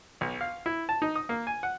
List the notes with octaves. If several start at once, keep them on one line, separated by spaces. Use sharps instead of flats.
B1
F5
E4
A5
D#4
D#6
A#3
G#5
F#5